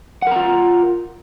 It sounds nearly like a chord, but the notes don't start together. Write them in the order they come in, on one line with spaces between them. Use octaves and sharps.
F#5 A#4 A#5 F4